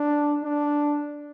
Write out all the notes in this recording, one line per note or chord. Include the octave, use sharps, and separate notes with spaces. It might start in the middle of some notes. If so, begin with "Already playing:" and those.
Already playing: D4
D4